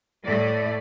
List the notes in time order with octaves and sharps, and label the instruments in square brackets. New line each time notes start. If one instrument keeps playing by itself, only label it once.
[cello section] A2 A3 D5